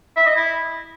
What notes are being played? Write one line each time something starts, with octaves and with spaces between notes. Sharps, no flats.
E5
D#5
E4